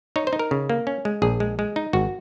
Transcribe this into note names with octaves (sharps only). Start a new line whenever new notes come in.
D#4 C#5
C5
D#4
A#4
C#3
A#3
C#4
G#3
A#1 G#4
G#3
G#3
D#4
G#1 F#4